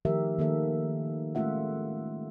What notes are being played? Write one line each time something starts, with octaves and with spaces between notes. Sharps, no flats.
D#3 F3 A3 G4 A#4 E5
D#3 A#3 A4 E5
G#3 A3 C#4 F4 E5 F#5